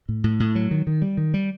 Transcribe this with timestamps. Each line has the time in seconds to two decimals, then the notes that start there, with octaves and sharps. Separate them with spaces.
0.09 A2
0.24 A2
0.40 A2
0.55 F#3
0.71 D#3
0.87 D#3
1.02 G3
1.17 D#3
1.34 G3